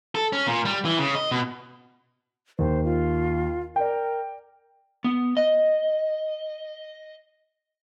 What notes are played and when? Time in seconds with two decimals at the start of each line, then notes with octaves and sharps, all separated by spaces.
0.15 A4
0.33 C#4
0.47 A#2
0.65 G3
0.85 E3
0.99 C#3
1.15 D#5
1.32 B2
2.59 D#2 C5
2.84 F4
3.76 A#4 D5 G5
5.04 B3
5.37 D#5